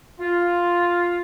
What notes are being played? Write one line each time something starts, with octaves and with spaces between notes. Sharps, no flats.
F4